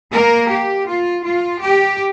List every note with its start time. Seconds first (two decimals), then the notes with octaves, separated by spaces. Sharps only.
0.12 A#3 A#4
0.49 G4
0.87 F4
1.24 F4
1.61 G4